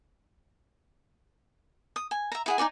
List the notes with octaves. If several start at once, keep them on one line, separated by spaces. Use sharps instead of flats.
D#6
G#5
E5 A#5
E4 G#4 F#5
D#4 F4 D5 G#5